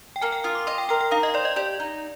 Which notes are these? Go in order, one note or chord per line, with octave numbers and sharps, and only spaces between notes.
G5
A#3 G#5
G5
F4 D#6
D6
D#5 C6
G5
A#4 G5
G5
D#4 F5
D#5
C5 D5
D#5
G4 D5
D#4